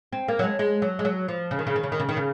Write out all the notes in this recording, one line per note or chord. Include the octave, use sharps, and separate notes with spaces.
C4
A#3
F#3
G#3
G#3
F#3
G#3
F#3
F3
C#3
D#3
C#3
D#3
C#3
D#3
C#3
D#3
C#3